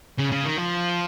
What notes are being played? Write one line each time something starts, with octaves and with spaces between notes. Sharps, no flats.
C#3
C#3
D#3
F3